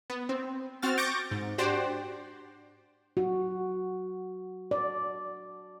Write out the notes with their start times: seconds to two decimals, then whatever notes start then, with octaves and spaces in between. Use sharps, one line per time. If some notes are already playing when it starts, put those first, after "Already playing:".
0.10 B3
0.29 C4
0.82 C4 F#4 F6 A6
0.98 C#6 D6 G6 A6 A#6 D7
1.31 G#2
1.58 D4 F#4 G4 C5 D5
3.17 F#4
4.71 D5